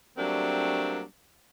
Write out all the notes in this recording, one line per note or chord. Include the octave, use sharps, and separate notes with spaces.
F#3 G3 A3 A#3 C4 D4